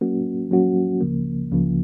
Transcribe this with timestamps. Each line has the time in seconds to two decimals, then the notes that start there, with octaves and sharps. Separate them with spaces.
0.01 F#3 A#3 C#4 F#4
0.51 F#3 A#3 C#4 F#4
1.00 C#2 C#3 F3 A#3
1.51 C#2 C#3 F3 A#3